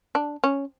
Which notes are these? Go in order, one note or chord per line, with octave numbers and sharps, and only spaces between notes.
D4
C#4